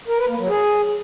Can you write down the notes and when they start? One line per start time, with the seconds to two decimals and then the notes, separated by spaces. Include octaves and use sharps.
0.08 A#4
0.18 B4
0.28 A#3
0.38 F#3
0.49 G#4